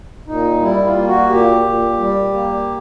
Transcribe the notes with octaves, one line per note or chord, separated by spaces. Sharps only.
A#2 D#4
G3 E4
F4
A#3
F#4
A#2 G4
A#2
G3
A#3